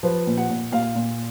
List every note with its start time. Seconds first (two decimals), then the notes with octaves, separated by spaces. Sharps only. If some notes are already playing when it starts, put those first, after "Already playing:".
0.03 F3 B4
0.27 A#2
0.38 F#5
0.50 A#2
0.72 A#2 F5
0.95 A#2